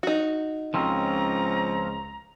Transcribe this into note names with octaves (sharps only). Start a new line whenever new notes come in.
D#4 F#4
C#2 F3 C4 C#4 A#5